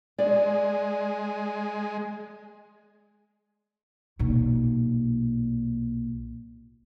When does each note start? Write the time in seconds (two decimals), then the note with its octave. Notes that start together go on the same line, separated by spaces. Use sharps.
0.18 G#3 D5
4.19 B1 A#2